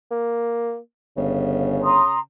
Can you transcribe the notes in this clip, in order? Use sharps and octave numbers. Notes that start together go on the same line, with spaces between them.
A#3
G1 C#3
A#5 C6 D#6